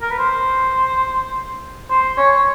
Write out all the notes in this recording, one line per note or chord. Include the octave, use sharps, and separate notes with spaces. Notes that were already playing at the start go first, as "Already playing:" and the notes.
A#4
B4
C5
C5
C#5